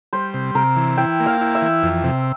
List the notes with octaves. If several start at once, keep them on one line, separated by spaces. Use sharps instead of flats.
G3 C5
C3
C3 A#4
E3
E4 G5
A#3
F5
E4
E5
E3
F2
C3